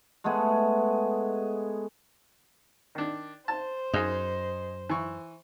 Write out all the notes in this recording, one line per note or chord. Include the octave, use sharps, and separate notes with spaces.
G#3 A3 B3 G#4
D#3 D4
C5 A5
F#2 D#4 G#4 D#5
E3 C#6